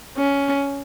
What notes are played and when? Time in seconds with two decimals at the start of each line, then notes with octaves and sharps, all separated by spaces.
0.17 C#4